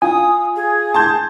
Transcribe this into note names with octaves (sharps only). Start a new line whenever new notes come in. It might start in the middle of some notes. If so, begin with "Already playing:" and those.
F4 G#5 D#6
G#4
A5 C6 G6